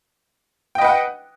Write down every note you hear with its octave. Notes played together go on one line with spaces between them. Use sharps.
B4 D#5 F#5 G5